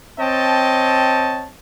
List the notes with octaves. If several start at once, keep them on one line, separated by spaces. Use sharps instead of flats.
C4 C#5 D#5 G5 A5